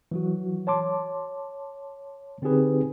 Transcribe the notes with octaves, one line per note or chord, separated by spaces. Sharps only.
E3 F#3 F#4
C#5 A5 C6 D6
D3 C4 D#4 G4 G#4 B4